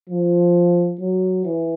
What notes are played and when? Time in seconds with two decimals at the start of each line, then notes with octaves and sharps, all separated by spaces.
0.10 F3
1.00 F#3
1.45 E3